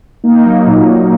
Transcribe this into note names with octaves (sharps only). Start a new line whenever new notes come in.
A#3 D#4
F#3
A#2
A#2